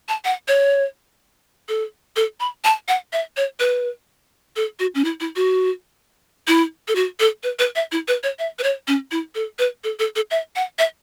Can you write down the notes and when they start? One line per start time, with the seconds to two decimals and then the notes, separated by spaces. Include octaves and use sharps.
0.09 A5
0.25 F#5
0.48 C#5
1.69 A4
2.16 A4
2.40 B5
2.64 A5
2.88 F#5
3.13 E5
3.37 C#5
3.60 B4
4.56 A4
4.79 F#4
4.95 C#4
5.05 E4
5.20 E4
5.36 F#4
6.48 E4
6.88 A4
6.95 F#4
7.20 A4
7.43 B4
7.59 B4
7.76 E5
7.92 E4
8.08 B4
8.23 C#5
8.39 E5
8.59 B4
8.63 C#5
8.88 C#4
9.11 E4
9.35 A4
9.59 B4
9.84 A4
9.99 A4
10.16 A4
10.31 E5
10.56 F#5
10.79 E5